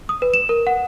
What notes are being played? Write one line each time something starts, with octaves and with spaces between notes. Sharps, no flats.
D#6
B4
E7
A#4
F#5